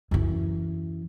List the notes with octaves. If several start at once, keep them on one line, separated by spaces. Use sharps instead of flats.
F#2 E3